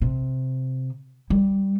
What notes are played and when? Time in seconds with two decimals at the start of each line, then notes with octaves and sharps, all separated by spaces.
0.02 C3
1.30 G3